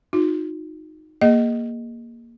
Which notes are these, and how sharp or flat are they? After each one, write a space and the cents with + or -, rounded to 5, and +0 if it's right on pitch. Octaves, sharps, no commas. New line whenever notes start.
D#4 +0 F#4 -45
A#3 +5 G#4 +0 D#5 +0